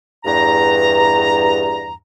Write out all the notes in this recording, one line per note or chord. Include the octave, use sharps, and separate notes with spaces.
E2 G2 A#5